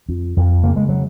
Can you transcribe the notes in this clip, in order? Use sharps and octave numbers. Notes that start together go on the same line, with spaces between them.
F2
F2
C#3 A#3
G#3
F#3